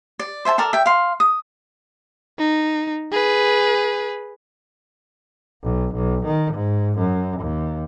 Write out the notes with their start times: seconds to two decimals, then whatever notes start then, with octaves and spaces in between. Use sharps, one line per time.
0.19 D5
0.45 C5 E5 G#5 A5
0.58 A4 A#4 D5 A5
0.73 E5 G5
0.86 F5 C6
1.20 D#6
2.38 D#4
3.12 G#4 B4
5.63 B1
5.95 B1
6.26 D#3
6.54 G#2
6.98 F#2
7.40 D#2